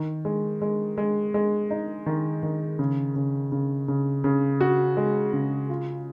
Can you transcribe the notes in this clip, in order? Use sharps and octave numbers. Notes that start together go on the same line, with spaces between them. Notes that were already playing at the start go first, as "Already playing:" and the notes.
Already playing: D#3
G#3
G#3
G#3
G#3
D#4
D#3
D#3
C#3
C#3
C#3
C#3
C#3
F#4
G#3
C#3
F4